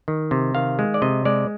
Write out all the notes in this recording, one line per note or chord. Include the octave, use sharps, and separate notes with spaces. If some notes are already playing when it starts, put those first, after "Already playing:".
D#3
C3
D#3 F5
G#3
D5
C3 D#5
G#3 D5